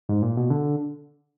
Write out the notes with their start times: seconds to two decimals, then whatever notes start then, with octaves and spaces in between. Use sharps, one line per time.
0.09 G#2
0.22 A#2
0.37 B2
0.50 D3